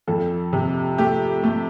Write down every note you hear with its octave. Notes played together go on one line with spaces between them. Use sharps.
F2 A4
C3
A3 G4
A3